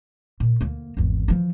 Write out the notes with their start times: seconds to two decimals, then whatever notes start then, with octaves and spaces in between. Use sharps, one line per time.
0.40 A#2
0.61 D2 A#3
0.97 G#1 E2
1.28 E3 F3